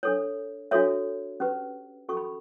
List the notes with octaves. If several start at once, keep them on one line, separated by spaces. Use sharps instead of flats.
D4 A4 C#5
D4 F#4 A4 C#5 E5
C#4 G4 B4
C#4 F#4 A4 C#6
B5